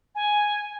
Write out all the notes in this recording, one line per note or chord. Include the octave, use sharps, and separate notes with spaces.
G#5